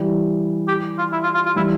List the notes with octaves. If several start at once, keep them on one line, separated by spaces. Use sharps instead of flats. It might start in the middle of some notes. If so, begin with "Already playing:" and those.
Already playing: E3 G3
G4
F4
E4
F4
F4
F4
E3 G3 E4